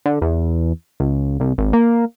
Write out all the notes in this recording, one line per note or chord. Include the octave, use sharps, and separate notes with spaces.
D3
E2
C#2
C2
G#1
A#3